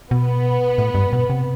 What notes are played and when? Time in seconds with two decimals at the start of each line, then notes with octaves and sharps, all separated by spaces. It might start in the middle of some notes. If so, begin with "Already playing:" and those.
0.11 B2 B3
0.78 A2
0.95 G2
1.13 B2
1.30 C3